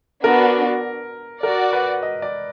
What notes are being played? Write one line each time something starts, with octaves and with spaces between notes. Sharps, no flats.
B3 D4 F#4 A#4
F#4 A#4 D5 F#5
B4
D#5
D5